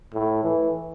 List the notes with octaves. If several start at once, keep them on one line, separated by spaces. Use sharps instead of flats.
A2
E3